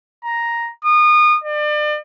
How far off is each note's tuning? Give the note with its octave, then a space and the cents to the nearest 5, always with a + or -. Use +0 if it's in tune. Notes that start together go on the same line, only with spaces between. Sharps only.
A#5 +5
D#6 -30
D5 +35